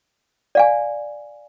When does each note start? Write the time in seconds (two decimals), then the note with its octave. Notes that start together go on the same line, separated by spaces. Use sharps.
0.55 D5 F5 G#5